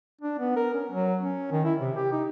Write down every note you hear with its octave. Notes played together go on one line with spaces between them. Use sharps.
D4
B3
A#4
C#4
F#3
C#4
D#3
E4
C3
G4
D#4